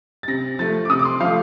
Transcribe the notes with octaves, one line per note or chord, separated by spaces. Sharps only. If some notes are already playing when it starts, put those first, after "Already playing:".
A6
C3 A#6
F3 A3 A6
D6
C3 D#6
D6
C6
F3 A3 F5